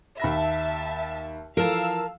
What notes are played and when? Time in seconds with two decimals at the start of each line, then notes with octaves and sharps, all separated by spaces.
0.20 D#2 E5 A5 B5 A#6
1.57 E3 F3 A#4 F5 A5 E6